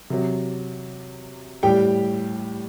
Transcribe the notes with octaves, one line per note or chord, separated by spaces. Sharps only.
C3 F#3
A2 G3 G4 G5